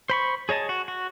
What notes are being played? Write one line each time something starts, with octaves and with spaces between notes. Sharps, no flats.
C5 B5 C#6
G#4 C#5 D#5 A5
F#4
F#4